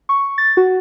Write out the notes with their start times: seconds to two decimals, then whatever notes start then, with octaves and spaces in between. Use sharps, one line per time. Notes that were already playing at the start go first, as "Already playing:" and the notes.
0.09 C#6
0.38 A6
0.57 F#4